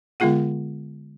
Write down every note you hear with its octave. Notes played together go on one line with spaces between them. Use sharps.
D3 G#3 B3 F4 G#4 F#5